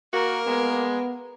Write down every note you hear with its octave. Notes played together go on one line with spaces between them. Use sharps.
A#3 F#4 A#4
G#3 B3